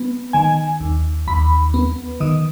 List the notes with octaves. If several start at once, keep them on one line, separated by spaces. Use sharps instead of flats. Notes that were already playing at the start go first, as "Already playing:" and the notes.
Already playing: B3
D#3 G#5
D#2
D#2 B5
B3
D#3 D#6